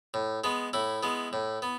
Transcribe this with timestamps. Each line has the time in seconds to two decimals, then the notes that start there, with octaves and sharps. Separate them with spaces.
0.14 A2
0.44 G#3 B3
0.73 A2 E4
1.03 G#3 B3
1.33 A2
1.62 B3